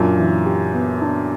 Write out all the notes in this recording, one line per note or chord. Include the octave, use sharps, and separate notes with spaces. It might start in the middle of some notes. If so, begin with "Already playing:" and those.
Already playing: F#2 A#2 D4
E3
G4
B3
D4